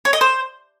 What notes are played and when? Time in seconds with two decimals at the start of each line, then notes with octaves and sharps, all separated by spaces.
0.05 C#5
0.13 D#5
0.21 C5